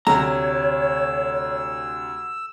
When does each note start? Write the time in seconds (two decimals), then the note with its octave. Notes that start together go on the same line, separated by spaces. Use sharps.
0.07 D2 C3 C#5 A#5 E6